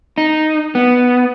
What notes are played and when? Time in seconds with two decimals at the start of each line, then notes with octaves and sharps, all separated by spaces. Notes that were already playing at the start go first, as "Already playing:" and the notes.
0.18 D#4
0.75 B3